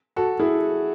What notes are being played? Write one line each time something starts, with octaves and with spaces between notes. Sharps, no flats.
F#4 A4
E4 G#4